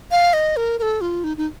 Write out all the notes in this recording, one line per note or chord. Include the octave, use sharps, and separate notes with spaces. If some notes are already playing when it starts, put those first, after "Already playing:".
F5
D#5
A#4
A#4
A4
F4
D#4
D#4